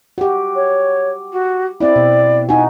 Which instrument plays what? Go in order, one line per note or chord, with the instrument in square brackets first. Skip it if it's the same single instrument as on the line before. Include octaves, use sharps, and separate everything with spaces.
[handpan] F#4 G4
[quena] C#5
F#4
[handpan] C4 E4 [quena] D5
[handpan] B2
[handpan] D#4 F#4 [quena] G#5